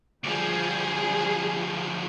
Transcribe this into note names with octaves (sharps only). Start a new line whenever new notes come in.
D2 F3 G3 G#4